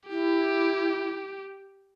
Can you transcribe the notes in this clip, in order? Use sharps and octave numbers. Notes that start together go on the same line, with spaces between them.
E4 G4